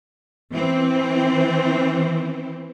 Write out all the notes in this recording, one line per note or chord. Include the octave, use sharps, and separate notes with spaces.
E3 C4